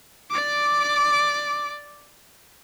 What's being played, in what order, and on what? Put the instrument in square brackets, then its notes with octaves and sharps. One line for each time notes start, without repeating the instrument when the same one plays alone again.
[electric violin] D5 D6